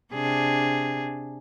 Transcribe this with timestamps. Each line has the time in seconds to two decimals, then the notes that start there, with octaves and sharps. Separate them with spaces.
0.13 C3 D4 G#4